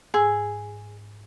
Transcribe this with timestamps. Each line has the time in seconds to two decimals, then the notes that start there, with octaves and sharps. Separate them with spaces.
0.14 G#2 G#4 G#5 E6